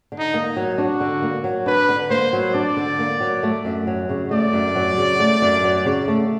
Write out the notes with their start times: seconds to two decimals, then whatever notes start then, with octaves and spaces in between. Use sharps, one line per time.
0.12 D3
0.19 D#4
0.34 A#3
0.57 F#3
0.78 D4 F#4
1.00 D3
1.22 A#3
1.44 F#3
1.66 D4 B4
1.89 D3
2.10 A#3 C5
2.33 F#3
2.54 D4 D5
2.77 D3
2.99 A#3
3.21 F#3
3.43 A3
3.65 F#2
3.87 F#3
4.09 C#3
4.31 A3 D5
4.53 F#2
4.76 F#3
4.97 C#3
5.20 A3
5.42 F#2
5.64 F#3
5.86 C#3
6.08 A3